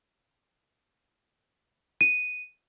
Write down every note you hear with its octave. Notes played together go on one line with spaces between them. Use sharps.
D#7